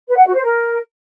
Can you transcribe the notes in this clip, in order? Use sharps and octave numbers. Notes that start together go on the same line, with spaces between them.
B4
F#5
F#4
C5
A#4